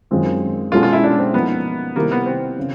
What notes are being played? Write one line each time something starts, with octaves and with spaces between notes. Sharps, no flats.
F#2 D#3 G#3 C4 F4
B2 G#3 C#4 F4 F#4 A4
F4
E4
D4
C4
F3 A#3 B3 D#4
C3 D#3 G3 A#3 C4 E4
B3
C4
C#3